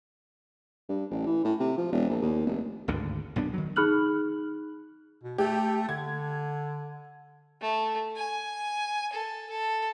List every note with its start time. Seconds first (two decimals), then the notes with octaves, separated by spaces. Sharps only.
0.89 G2
1.10 A1
1.26 E3
1.45 A2
1.60 C3
1.78 F3
1.92 E1
2.09 A#1
2.22 D#2
2.46 F1
2.88 G#1 D2 G2 D3
3.36 B1 F#2 B3 D4
3.53 D#3 F#3
3.76 D#4 G#4 B5 F6 F#6 F#7
5.23 B2
5.38 A3 G4
5.89 D3 G#6
7.61 A3
8.16 G#5
9.13 A4
9.50 A4